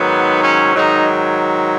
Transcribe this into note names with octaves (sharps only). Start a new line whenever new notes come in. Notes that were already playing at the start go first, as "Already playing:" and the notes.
Already playing: G#2 D#3 F#3 B3
C#4
G#2 D#3 F#3 D#4